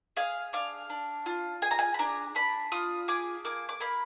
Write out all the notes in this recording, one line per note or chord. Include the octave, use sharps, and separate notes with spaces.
G#4 F5
D4 F5
D4
F4
G#4 G#5
A#5
G#5
B5
D4 A#5
D4 B5
F4 D#6
G#4 D6
A#3 D6
D6
A#3 B5